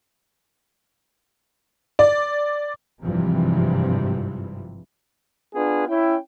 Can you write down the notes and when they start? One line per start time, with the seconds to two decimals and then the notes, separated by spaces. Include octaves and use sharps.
1.99 D5
3.02 G#1 G2 C3 E3 F3
5.55 B3 D4 F4 G#4 B4
5.87 C#4 E4 G5